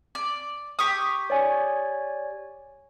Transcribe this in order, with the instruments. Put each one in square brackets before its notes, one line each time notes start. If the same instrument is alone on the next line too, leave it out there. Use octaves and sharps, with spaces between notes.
[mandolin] D5
G4 C#6 D#6
[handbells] C#5 D5 G#5